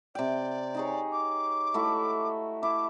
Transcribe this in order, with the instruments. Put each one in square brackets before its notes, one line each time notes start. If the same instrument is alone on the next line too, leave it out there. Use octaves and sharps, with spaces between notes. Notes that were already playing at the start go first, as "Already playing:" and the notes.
[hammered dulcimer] C3 G5 [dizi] D5
[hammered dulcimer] D#4 G#4 C#5
[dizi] D6
[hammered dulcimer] A3 E4 F#4
[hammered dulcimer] E4 [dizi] D6